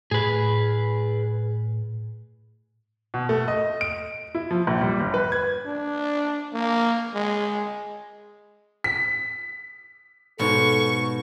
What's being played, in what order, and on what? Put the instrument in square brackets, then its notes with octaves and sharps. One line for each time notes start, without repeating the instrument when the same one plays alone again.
[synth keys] A2 [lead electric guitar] G#4 B4
[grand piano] B2
A3
D#5
D7
E4
F3
A#1
G3
G1
B4
G#6
[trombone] D4
A#3
G#3
[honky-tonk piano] B6
[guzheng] G#2 B2 [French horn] A4 [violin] C#6